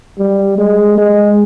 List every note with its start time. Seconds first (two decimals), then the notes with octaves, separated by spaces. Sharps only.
0.19 G3
0.58 G#3
0.98 G#3